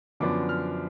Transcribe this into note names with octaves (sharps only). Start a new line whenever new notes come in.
F#2 D3 F3 B3 D4 D6
F6